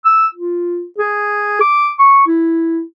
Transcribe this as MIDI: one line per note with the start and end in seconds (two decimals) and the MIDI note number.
0.05 0.27 88
0.35 0.84 65
0.98 1.60 68
1.61 1.91 86
1.99 2.26 85
2.27 2.82 64